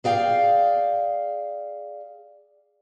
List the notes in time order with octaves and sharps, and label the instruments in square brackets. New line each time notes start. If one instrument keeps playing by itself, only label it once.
[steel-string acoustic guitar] G#4 D5 F5 G5